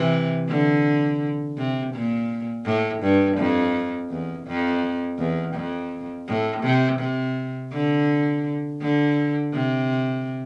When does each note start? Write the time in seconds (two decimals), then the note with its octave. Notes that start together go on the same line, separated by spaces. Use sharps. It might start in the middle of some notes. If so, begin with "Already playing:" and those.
Already playing: C3 E3
0.48 D3
1.57 C3
1.94 A#2
2.65 A2
3.02 G2
3.37 F2
4.10 E2
4.47 F2
5.18 E2
5.55 F2
6.28 A2
6.63 C3
6.99 C3
7.72 D3
8.81 D3
9.53 C3